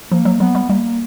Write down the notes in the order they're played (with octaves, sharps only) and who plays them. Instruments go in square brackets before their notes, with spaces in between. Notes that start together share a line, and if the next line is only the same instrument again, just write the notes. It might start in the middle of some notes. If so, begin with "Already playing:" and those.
[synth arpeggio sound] F3 [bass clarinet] A#3
[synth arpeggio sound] F#3
[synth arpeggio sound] F#3 [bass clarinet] B3
[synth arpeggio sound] G3
[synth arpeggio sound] G3 [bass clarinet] A#3